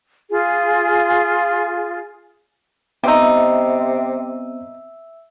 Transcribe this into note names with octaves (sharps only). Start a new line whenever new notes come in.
F4 G#4
C3 G3 B3 C4 D#4 C5 E5 E6